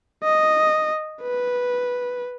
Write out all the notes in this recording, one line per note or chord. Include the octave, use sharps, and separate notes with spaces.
D#5
B4